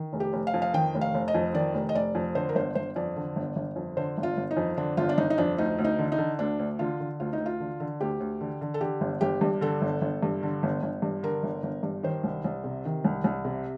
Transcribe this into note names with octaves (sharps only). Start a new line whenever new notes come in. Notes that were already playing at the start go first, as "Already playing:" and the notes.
Already playing: D#3
F1
G4
F1
F5
F2
F5
D#3 G5
F1
F5
F1
D#5
F2
D#3 D5
F1
D#5
F1 D5
F2
D3 C5
A#4
G1 C5
G1 C5
F2 D5
D3
G1
G1
F2
D3 C5
G1
F4
G1
D#4
F2
D3 D4
G1 F4
D4
G1 D#4
D#4
F2 D4
D2 D#4
D2
D#4
D3
D#4
D3
D2 D4
D2
D3 F4
D3
D2 F4
D#4
D2
F4
D3
D3
D2 G4
D2
D3
D3
A4
D3 G4
G1
G1 G4
G2
D3 A4
G1
G1
G2
D3
G1
G1
G2
D3 A#4
G1
G1
G2
D#3 C5
C2
C2
C3
D#3
C2
C2
C3